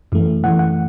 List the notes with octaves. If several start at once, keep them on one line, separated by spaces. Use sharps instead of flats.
F#2 E3 A3
F#2 E3 A3 F#5
F#5